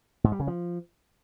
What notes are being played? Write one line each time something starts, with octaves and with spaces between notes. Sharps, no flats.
G#2
G3
C#3
F3